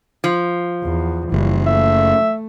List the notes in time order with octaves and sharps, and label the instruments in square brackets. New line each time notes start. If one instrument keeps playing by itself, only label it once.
[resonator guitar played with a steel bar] F3
[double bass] E2
[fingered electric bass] F#1 [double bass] E3 G3
[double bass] A3 [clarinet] E5